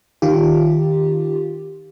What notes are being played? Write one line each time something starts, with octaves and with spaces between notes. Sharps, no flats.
D#3 F4 G4